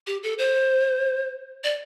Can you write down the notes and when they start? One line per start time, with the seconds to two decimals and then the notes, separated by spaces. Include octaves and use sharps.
0.07 G4
0.23 A4
0.38 C5
1.64 D5